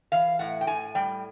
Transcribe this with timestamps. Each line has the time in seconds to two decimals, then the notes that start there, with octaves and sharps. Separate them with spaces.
0.12 E3 F5
0.39 A2 F#5
0.61 G5
0.67 A2 G#5
0.95 G3 G5